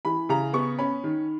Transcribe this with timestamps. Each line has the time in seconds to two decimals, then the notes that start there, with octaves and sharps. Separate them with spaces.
0.05 E3 B5
0.29 C#3 A#5
0.53 B3 C#6
0.78 C#4 B5
1.04 D#3